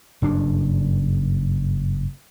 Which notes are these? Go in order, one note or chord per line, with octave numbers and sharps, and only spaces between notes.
F#1 G2 D4